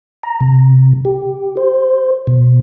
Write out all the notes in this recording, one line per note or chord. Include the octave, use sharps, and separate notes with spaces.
A#5
C3
G4
C5
B2